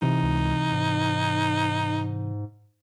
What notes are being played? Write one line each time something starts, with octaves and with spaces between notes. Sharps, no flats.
C3 E3 D#4
C#2
G#2